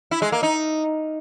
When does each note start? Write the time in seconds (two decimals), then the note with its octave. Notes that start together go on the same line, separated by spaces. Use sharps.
0.11 E4
0.22 G#3
0.32 A#3
0.43 D#4